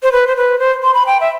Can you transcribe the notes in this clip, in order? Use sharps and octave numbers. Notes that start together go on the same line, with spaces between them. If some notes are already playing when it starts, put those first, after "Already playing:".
C5
B4
C5
B4
C5
C6
B5
G5
E5